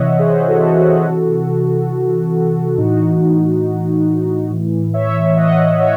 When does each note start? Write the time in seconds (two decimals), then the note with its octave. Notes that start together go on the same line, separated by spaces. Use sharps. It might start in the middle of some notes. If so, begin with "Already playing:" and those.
Already playing: C3 E3 C#5 D#5 E5 F#5
0.19 G#4 C5
0.47 F#4 A4
0.77 F#4 A4
1.06 C3 E3
2.77 A2 E3 D#4 F#4
4.50 A2 E3
4.94 C#5 E5
5.36 D#5 F#5
5.79 C#5 E5